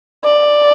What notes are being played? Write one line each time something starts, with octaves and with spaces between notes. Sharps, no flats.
D5